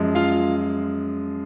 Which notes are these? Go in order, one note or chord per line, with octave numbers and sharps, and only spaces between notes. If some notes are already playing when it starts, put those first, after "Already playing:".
Already playing: F#2 F3 G#3
F4 F5